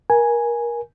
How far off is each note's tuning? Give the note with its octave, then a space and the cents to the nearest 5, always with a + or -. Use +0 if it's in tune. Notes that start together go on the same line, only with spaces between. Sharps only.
A#4 +25 G#5 +0